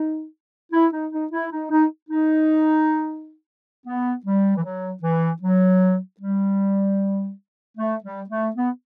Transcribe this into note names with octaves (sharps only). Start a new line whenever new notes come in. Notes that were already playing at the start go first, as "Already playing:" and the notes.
Already playing: D#4
E4
D#4
D#4
E4
D#4
D#4
D#4
B3
G3
E3
F#3
E3
F#3
G3
A3
G3
A3
B3